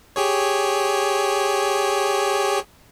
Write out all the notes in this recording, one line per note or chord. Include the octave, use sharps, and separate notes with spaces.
G4 G#4 C#5